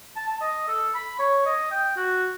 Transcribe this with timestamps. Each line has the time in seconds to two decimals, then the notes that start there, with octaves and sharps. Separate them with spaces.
0.16 A5
0.28 A5
0.41 D#5
0.68 A4
0.94 B5
1.19 C#5
1.46 D#5
1.71 G5
1.96 F#4